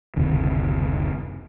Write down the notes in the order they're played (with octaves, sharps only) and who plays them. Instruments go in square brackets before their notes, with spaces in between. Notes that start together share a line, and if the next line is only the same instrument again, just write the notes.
[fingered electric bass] F#1 D2 C3 D#3